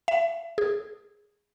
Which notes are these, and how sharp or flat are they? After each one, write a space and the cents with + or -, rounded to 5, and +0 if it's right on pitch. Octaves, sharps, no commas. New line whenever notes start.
E5 +30
G#4 -10